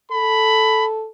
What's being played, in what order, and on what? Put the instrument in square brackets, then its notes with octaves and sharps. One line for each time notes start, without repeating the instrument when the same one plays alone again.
[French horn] A4 [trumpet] B5